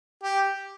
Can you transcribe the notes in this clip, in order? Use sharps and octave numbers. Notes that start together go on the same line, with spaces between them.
G4